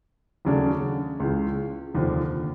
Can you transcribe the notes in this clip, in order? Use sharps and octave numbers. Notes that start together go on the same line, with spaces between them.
D#2 C#3 F#3 A3 D4
C#2 C#3 E3
F1 D#2 D3 F3